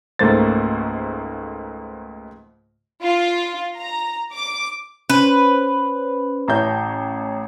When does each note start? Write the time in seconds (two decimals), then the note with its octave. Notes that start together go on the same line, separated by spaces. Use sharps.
0.19 C#2 G#2 A3 A#3 C5 A6
3.03 F4
3.77 A#5
4.33 D6
5.10 C#4 B4 C5
6.48 A1 E4 C#5 A5 A#5 G6